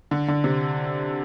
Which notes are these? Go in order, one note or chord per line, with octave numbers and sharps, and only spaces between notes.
D3
D3
C3